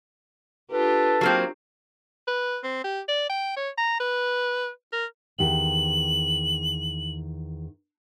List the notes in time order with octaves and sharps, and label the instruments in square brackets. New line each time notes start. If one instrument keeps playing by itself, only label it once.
[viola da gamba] D4 F4 G4 [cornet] A4 [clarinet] B4
[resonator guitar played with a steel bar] F#3 A#3 C4
[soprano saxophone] B4
C4
G4
D5
G5
C#5
A#5
B4
A#4
[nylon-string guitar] E2 D#3 G4 [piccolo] F#7